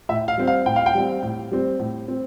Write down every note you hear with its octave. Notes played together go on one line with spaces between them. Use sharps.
A2 E5
F5
G3 C4
F5
A2 G5
F5
G5
G3 C4
A2
G3 C4
A2
C4